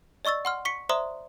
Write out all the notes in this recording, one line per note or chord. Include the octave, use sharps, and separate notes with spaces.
D5 D#5 C#6 E6 A6
F#5 C6 F6
C#6 B6 C#7
C5 D5 E5 A#5 C6 D#6